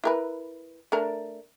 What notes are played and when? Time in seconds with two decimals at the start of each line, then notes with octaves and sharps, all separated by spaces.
0.04 E4 A#4 B4
0.92 A3 D4 A#4